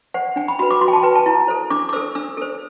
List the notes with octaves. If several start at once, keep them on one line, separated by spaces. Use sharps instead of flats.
C5 F#5
D4 G5
B5
F#4 B4 B5
D6
F#4 C6
G5
A5
B4 G5
A5
E4
A4 C5
D4 D6
D6
A4 C5 E6
D4 E6
A4 C5